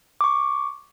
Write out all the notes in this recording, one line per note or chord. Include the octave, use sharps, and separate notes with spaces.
C#6 D6